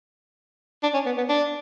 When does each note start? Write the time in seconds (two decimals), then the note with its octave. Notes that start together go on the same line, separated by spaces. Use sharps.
0.83 D4
0.94 C#4
1.06 B3
1.17 B3
1.29 D4